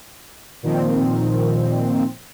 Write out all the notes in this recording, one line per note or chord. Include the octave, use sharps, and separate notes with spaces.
A#2 D#3 F3 C4